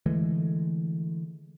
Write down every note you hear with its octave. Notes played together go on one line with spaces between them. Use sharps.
D3 E3 G#3 A3